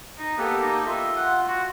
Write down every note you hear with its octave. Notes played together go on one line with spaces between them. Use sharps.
D#4
A#3 B3 G4 A4
D#4
F4 E5 C6
F#5
F#4